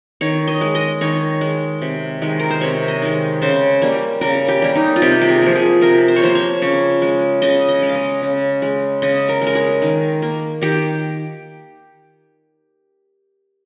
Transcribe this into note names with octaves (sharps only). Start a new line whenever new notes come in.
D#3 C#5
D#5
G#3
D#5
D#3 C#5
G#3
C3
D#3 G#3
A#4
C5
C3 C#5
D#5
D#3 G#3
C#3 C5
G3 A#3
C#3 A#4
G4
G3 A#3
D#4
F4
C3 G4
G4
G#4
F3 A#3
G#4
C3 A#4
C5
C#5
F3 A#3 C5
C#5
C#3 C#5
G#3
C#3 D#5
D#5
G#3
F5
D#5
C#3
G#3
C#3 D#5
A#4
G#3
A#4
G#4
D#3
A#3
D#3 G4